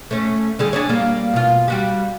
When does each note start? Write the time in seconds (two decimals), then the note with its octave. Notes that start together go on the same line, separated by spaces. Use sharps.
0.11 A3 C#4
0.59 D3 G3 G#4
0.73 D4 G#4 C#5
0.89 G3 A#3
1.33 B2 F4
1.68 G3 F#4 G4